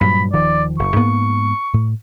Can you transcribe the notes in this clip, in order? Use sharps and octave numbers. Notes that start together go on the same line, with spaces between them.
G2 A#2 F#3 B5
D#1 D#3 F3 D5
F#1 C#6
G#2 A#3 B3
A2